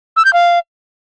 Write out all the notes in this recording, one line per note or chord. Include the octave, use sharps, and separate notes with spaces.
E6
G6
F5